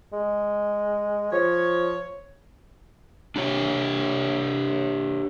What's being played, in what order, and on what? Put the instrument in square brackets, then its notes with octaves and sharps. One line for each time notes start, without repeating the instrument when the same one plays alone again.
[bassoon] G#3
[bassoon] F3 [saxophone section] C#5
[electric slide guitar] D4 G4 C#5